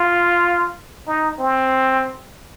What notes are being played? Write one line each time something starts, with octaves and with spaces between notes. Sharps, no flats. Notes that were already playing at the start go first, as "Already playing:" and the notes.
Already playing: F4
D#4
C4